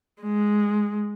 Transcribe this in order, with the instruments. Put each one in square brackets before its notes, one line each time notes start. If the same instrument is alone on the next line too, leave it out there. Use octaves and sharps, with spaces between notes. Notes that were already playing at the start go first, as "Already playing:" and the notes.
[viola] G#3